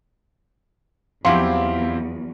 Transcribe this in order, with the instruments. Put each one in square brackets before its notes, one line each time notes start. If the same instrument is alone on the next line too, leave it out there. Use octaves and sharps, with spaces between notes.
[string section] E2 [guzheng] F3 F#3 [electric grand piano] C4 E4 G4 [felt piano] F5 C6